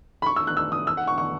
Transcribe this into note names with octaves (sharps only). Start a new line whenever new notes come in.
B5
C#6
E6
F#6
E6
D#6
E6
F#5
C#6
C#6